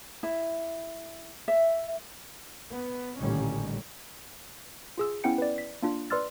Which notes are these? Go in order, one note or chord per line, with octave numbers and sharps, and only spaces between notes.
E4
E5
B3
A1 A#2 D3 D#3 G3 C#4
F4 G#4 E6
B3 C#4 E4 F#5 G5 C#7
B4 D5
B6
A#3 D4 F4
B4 D5 C6 E6 F6 A6